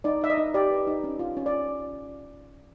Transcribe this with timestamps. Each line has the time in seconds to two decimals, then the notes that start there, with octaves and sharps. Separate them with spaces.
0.04 D#4 D5
0.21 D#4 E5
0.30 D#5
0.37 D#4
0.54 G4 D5
0.71 B4
0.87 D#4
1.04 C#4
1.19 F4
1.37 C#4
1.46 D5